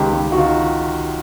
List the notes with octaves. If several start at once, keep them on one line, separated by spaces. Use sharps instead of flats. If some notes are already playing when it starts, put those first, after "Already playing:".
Already playing: C#2 D#3 G4
C#2
F#4
D#3 F4